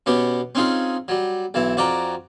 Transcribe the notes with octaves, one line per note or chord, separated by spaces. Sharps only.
B2 B3 C#4 G4
C4 C#4 D#4 F4 G#4
F#3 G3
B1 E3 E4
F2 F#4 D5 G5 A#5